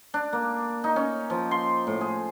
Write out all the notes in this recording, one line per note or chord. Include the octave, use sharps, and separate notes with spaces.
D4
A#3
D#4
C#4
F3
C6
A2
G#4